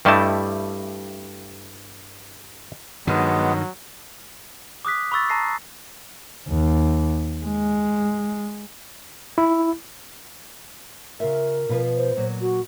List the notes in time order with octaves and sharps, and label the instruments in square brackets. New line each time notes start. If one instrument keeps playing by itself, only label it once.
[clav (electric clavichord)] G2 G3 A3 E4 D#5 A5
[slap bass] G2 D#3 [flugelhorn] F#3 [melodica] G#3 B3
[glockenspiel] D6 D#6 F#6 B6
B5 C#6 E6 A6
A5 A#5 A#6 C7
[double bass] D#2
G#3
[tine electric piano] E4
[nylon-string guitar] C#3 F4 E5 [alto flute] A#4
[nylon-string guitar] B2 F3 B4
[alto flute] C5
[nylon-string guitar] A#2 F#3
[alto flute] F#4